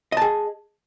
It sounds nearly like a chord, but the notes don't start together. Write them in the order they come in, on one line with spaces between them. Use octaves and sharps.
D#5 A5 G#4